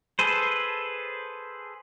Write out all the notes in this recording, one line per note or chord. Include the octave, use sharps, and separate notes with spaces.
G#4 A4 B4 C5